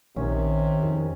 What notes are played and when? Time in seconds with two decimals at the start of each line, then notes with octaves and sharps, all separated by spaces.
0.16 A#1 C3 D#3 C#4
0.83 F2